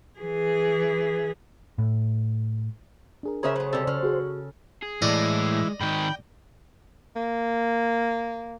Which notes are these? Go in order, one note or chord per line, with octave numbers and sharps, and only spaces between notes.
E3 G#4
A2
D4 G#4 A#4
C#3 C#4 G#4 A#4 C5 E5 A#5 D#6
F#3 A3
C3 G3 A4
C#3 F#3 F6
F#4 G#4
G#4
A2 E3 G#3 D5 D#5
G#2 D#3 G5 B5
A#3